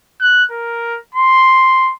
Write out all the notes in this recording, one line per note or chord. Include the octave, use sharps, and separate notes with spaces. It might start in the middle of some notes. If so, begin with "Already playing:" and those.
F#6
A#4
C6